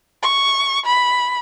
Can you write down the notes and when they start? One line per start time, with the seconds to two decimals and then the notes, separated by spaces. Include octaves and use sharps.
0.23 C#6
0.86 B5